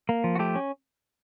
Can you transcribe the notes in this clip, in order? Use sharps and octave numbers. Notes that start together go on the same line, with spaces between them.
A#3
F3
F#4
A3 G4
C#4